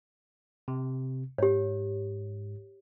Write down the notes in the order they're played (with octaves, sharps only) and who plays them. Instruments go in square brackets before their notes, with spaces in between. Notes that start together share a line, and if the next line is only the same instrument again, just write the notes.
[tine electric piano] C3
[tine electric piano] G#2 [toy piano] G4 C#5